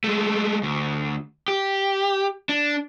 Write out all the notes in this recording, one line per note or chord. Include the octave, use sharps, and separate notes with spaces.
G#3 A3
D2
G4
D4